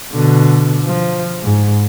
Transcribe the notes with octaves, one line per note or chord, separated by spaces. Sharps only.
B2 D3
F3
G#2